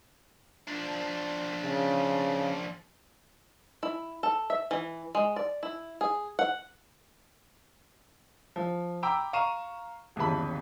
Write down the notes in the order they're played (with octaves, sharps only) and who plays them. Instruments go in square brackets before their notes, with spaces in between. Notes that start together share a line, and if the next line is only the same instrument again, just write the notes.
[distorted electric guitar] F3 D4
[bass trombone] C#3
[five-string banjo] E4
A4
E5
E3
G#3
D5
E4
G#4
F#5
[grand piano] F3
G5 A#5 B5 D6 E6
F5 A#5 C#6 D#7 E7
G1 D#2 C#3 E3 A5 B5